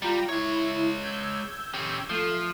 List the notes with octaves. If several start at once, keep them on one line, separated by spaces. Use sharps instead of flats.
G3 F4 G5 A#5
G#3 E4 C#5
E6 G6 G#6
C#4 G4
F3 A3 C7